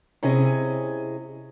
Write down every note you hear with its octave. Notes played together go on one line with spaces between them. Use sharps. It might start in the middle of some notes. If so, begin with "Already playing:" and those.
C3 C#4 E4 G#4 D#5